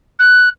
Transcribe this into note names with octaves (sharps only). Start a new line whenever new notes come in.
F#6